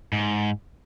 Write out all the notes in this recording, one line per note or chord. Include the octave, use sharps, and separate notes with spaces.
G#2